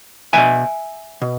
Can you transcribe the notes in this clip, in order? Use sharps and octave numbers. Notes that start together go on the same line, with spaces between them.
C#2 B2 E5 G#5
B2